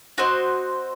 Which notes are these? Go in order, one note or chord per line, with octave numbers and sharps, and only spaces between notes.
C4 F#4 C5 D#5